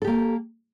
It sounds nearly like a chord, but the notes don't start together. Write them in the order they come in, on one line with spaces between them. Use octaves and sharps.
A4 G4 A#3